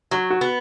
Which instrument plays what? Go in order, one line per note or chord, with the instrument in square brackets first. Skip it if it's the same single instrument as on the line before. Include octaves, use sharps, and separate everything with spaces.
[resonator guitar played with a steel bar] F#3 [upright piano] F#4
[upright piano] F#4
[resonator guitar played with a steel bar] B3